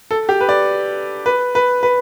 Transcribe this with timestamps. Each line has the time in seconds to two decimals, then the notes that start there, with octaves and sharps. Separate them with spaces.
0.11 A4
0.29 G4
0.41 B4
0.49 D5
1.26 B4
1.55 B4
1.83 B4